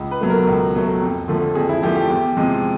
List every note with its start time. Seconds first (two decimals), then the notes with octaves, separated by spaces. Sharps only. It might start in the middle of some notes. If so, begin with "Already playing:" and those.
Already playing: C#2
0.11 B4
0.21 B2 F#3 A3
0.30 A#4
0.47 C#2
0.75 B2 F#3 A3
1.02 F2
1.28 D3 F3 A3
1.55 F2 G#4
1.69 E4
1.82 D3 F3 A3 G4
1.96 G4
2.10 E2 G4
2.37 C3 F3 G#3